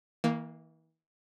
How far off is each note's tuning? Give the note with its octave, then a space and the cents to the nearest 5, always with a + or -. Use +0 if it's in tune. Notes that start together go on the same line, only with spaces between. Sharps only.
E3 -40 A#3 +0